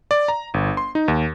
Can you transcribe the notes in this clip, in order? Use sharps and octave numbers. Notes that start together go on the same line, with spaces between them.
D5
A#5
G1
C6
D#4
D#2